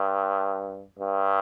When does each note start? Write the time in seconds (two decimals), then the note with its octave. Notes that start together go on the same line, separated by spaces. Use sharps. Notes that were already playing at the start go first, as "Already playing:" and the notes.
Already playing: G2
1.00 G2